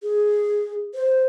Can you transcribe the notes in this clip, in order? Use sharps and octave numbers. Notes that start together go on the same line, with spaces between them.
G#4
C5